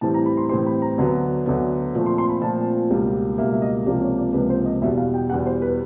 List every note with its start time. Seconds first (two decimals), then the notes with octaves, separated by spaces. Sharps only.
0.01 A2 E3 G3 C4 A5
0.14 A#5
0.26 B5
0.37 C6
0.49 A2 E3 G3 C4 C6
0.66 B5
0.82 A#5
0.98 D2 D3 F#3 B3
1.46 D2 D3 F#3 B3
1.94 A#2 F3 A3 C4
2.06 C6
2.18 C6
2.29 B5
2.41 A#2 F3 A3 C4 A5
2.90 C#2 B2 G3 A#3
3.38 C#2 B2 G3 A#3 E5
3.53 E5
3.62 D#5
3.86 C#2 C3 F3 A#3 D5
4.02 C#5
4.18 D5
4.33 C#2 C3 F3 A#3 B4
4.50 C5
4.66 D#5
4.81 E2 B2 G3 E5
4.98 F5
5.14 G5
5.30 E2 B2 G3 F#5
5.46 C5
5.62 B4